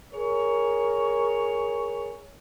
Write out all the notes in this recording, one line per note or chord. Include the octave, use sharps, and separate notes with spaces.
G#4 A#4 C#5